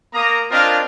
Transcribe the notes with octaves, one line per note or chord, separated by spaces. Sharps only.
A#3 A#5 D#6
C4 D4 F4 A#4 D#5 F5